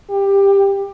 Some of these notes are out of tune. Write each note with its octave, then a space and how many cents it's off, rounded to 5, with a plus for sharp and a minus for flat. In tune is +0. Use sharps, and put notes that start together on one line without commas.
G4 +15